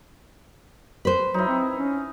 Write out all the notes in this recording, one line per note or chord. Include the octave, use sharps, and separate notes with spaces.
B4 C5
F#3 D#4 E4
C4
C#4